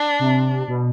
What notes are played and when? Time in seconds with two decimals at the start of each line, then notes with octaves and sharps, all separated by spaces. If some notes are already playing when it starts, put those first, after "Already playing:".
Already playing: D4
0.19 C3
0.68 B2